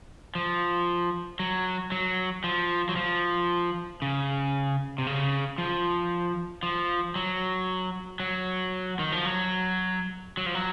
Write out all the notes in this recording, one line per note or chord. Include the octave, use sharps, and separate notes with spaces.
F3
F#3
F#3
F3
F#3
F3
C#3
C3
C#3
F3
F3
F#3
F#3
D#3
F3
F#3
F#3
F3
F#3